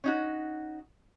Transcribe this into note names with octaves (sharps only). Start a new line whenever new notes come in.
C#4 D#4 F#4